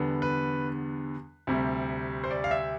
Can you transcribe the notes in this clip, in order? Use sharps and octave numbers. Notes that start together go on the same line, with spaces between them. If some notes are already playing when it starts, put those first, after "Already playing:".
Already playing: E2 D3 G3 B3
B4
D2 C3 G3
C5
D5
F5
E5